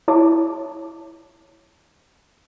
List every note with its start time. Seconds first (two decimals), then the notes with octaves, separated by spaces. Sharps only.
0.08 E4 G#4 C#5 A5 C6 D6